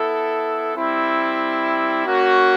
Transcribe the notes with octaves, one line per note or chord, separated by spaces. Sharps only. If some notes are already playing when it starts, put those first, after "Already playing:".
Already playing: B3 E4 A4
G3 C4 E4
A#3 C#4 F#4